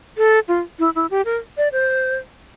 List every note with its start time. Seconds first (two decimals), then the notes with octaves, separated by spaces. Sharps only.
0.18 A4
0.48 F4
0.79 E4
0.95 E4
1.11 G4
1.25 A#4
1.57 D5
1.72 C5